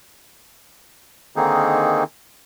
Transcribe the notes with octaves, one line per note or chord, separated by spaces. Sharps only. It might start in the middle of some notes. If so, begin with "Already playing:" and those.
D3 D#3 A#3 C4 D#4 G#4